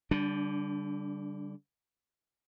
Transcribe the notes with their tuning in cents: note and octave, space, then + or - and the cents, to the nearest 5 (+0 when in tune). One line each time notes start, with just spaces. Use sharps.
D3 -35 G3 +0 D4 +0